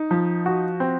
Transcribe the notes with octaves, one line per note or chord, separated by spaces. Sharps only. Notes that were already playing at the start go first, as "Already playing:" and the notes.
Already playing: D#4
F3
F#4
C4